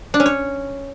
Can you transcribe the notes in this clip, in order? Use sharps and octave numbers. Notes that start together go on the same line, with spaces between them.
D4
C#4
C#5